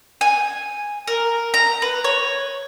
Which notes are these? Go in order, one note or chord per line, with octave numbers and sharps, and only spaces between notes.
G#5
A#4
A#5
B4
C#5